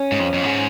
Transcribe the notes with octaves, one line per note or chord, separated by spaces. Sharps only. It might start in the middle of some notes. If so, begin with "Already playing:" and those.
Already playing: C#4
G#2
F2
F2
G#2